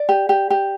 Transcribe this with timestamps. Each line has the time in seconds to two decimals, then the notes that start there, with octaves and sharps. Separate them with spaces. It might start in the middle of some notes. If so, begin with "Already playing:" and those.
Already playing: D5
0.09 G4
0.29 G4
0.50 G4